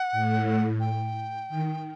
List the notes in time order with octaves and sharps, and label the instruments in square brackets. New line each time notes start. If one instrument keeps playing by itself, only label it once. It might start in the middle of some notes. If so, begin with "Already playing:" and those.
Already playing: [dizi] F#5
[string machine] A2
[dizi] G5
[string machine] D#3